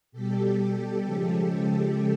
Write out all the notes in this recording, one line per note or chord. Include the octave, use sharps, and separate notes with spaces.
B2 G3 G4 A4
C#3 F3 G#3 G4 A4